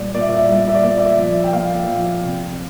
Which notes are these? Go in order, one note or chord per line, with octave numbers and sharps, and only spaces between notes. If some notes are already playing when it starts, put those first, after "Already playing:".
Already playing: A#2 G3 D5
A#2 D5
E5
D5
E5
D5
G3 E5
D5
E5
D5
A#2 E5
D5
E5
D5
F3
G5
A#2 F5
F3
C3